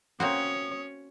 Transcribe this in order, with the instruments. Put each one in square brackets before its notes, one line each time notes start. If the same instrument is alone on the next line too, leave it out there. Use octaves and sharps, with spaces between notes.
[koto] A#3 C4 F#4 [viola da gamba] C#4 C#5 [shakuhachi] D#6